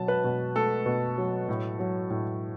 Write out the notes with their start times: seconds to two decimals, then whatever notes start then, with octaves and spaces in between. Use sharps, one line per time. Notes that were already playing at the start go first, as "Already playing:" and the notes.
Already playing: B2 F#3 A5
0.08 B4
0.24 B2
0.55 A3 A4
0.86 B2
1.18 F#3
1.49 A2
1.79 F#3
2.10 A2